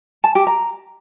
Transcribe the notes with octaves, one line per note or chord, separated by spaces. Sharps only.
A5
G4
A#5